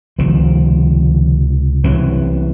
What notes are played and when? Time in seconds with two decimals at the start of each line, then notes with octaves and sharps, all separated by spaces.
0.19 C#2 C3 D#3 F3
1.84 C2 C3 E3 F#3